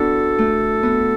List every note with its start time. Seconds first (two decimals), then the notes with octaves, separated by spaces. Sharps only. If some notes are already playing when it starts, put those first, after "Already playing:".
Already playing: B3 D4 E4 F#4 A4
0.38 A3
0.83 B3